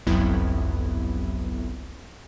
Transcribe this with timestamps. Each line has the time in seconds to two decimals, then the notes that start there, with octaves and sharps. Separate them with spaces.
0.06 G1 C2 F2 F#3 B3 E4